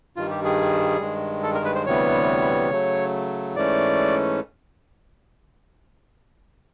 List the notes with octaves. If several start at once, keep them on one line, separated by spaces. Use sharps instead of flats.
G2 D#3 G3 F4
G4
G#4
G2 D#3 G#3
A4
A#4
B4
C5
D2 C3 E3 G3 B3 C#5
C#3 F#3 A3
G#2 E3 A3 C#4 D5